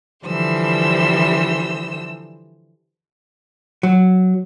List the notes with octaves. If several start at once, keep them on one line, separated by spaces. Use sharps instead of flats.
D3 E3 F3 G3 C5 E6
F#3